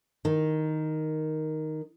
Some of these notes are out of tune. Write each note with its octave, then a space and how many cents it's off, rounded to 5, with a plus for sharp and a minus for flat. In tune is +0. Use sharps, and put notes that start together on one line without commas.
D#3 +0